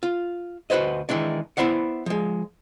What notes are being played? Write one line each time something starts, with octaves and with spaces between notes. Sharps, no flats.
F4
D2 F#4 B4 C5 D#5
D#3 E3 G#3 D4
B3 C4 E4 C5 D5 F#5
F3 G#3